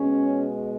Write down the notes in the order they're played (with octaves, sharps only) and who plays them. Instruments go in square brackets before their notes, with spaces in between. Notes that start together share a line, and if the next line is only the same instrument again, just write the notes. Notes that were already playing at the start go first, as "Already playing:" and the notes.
Already playing: [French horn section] B2 G#3 C#4